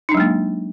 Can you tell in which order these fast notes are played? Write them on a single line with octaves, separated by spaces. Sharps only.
D#4 D4 F#3 G#3 A#3